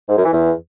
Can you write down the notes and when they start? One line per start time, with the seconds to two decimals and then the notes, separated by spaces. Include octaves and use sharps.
0.09 G#2
0.17 F#2
0.24 E3
0.32 E2